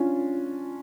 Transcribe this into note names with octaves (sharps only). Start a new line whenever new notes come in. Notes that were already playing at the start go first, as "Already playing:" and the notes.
Already playing: C#4 D4 F4